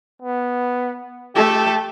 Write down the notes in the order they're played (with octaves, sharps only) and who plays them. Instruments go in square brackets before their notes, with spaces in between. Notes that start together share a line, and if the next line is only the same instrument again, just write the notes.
[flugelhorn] B3
[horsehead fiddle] A3 A4 [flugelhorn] G4